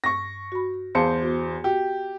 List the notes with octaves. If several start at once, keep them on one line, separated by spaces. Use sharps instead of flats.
G2 C#6 A#6
F#4 B5
E2 C5 F5 A5 G6 C#7
B3 F#4
F#4 G4